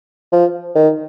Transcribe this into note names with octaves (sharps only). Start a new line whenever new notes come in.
F3
D#3